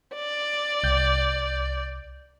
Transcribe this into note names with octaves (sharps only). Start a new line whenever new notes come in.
D5
C2 G6